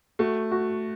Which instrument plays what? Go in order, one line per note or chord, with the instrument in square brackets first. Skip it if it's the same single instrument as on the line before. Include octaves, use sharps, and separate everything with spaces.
[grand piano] A3 [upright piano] F#4
[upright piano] F#4